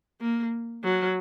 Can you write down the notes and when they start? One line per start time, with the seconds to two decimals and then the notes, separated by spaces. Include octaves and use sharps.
0.21 A#3
0.84 F#3